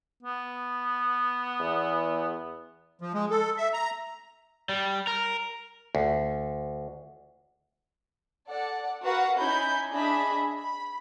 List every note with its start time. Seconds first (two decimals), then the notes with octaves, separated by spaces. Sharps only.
0.23 B3
1.60 E2
3.01 F3
3.14 G#3
3.31 A4
3.58 E5
3.73 A#5
4.69 G3
5.07 A#4
5.95 D2
8.47 A4 D5 F#5
9.03 F#4 A#4 B4 F5 F#5
9.38 C#4 D#4 E4 G#5 B5 G6
9.91 D4 G#4 D#5 E5 B5
10.59 B5